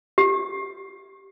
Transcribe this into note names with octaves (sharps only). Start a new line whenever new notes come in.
G4